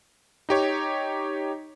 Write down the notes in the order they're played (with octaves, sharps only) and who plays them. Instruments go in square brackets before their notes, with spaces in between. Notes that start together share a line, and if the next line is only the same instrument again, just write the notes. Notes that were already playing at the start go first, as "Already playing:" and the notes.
[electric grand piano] D#4 G4 C#5